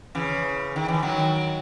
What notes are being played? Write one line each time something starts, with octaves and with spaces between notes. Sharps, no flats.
C#3 E3
D#3
E3
D#3 F#3